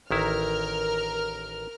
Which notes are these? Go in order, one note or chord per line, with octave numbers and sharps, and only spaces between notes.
A1 D#3 E4 A#4 F6